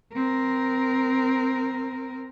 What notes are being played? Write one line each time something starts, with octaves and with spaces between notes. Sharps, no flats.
C4 A#4